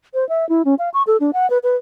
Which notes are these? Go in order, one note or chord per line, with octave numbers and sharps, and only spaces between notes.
C5
E5
E4
C#4
F5
C#6
A4
D4
F#5
B4
B4